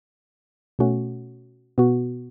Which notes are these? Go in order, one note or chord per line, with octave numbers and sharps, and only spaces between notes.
B2 A3 C#4 F#4
B2 B3 F#4